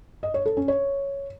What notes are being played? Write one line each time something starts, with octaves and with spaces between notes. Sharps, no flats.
D#5
C#5
A4
C#4
C#5